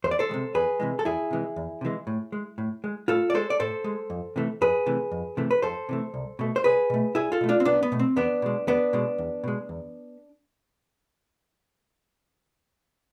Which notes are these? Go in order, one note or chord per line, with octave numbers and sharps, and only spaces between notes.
E2 C5
D5
A4 C5
C3 E3 G#3
E2 G#4 B4
C3 E3 G#3
A4
E2 E4 G#4
C3 E3 G#3
E2
C3 E3 G#3
A2
G#3
A2
G#3
A2 F4 A4
D5
G#3 A4 C5
D5
A2 A4 C5
G#3
F2
C3 E3 A3
F2 G#4 B4
C3 E3 A3
F2
C3 E3 A3
B4
F2 A4 C5
C3 E3 A3
C2
B2 A3
C5
C2 G#4 B4
B2 A3
C2 E4 G#4
F4 A4
B2 A3
D4 F4
C4
C2 B3 D4
B3
B2 A3
C4
E2 B3 D4
B2 G#3
E2 B3 D4
B2 G#3
E2
B2 G#3
E2